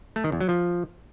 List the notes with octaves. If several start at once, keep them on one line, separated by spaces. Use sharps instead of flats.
A3
D#3
E2
F#3
F3